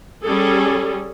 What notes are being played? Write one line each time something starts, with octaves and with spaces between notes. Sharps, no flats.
G3 C#4 G#4 A4